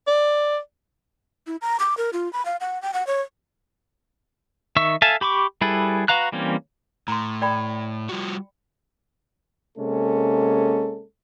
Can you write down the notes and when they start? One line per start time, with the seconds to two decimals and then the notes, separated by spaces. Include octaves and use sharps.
0.07 D5
1.47 E4
1.62 A#5
1.80 D6
1.97 A#4
2.13 F4
2.33 B5
2.45 F5
2.61 F#5
2.82 G5
2.94 F#5
3.07 C#5
4.76 D#3 E5 C#6 E6
5.02 A4 E5 F5 G#5 A5
5.21 G4 B5 C#6 D6
5.61 G3 E4 G#4 A4 B4
6.08 F#4 B4 F5 A#5 F#6
6.32 E3 G3 A#3 C4 C#4
7.08 A2 A#5 C6
7.42 D5 G5 B5
8.09 G3 F4 F#4
9.78 C3 G#3 A#3 C#4 A4